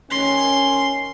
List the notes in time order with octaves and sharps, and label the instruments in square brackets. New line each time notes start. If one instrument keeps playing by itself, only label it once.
[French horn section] D#3 C#4 [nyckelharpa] C6